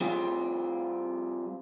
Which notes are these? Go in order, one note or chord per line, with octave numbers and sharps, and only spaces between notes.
G3 C4 F4 G#4